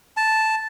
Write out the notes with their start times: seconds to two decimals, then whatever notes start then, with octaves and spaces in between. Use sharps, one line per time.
0.17 A5